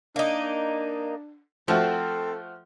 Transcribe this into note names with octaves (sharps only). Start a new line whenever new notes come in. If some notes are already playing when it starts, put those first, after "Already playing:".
A#3 D4 D#4
F3 A3 C4 F#4 A4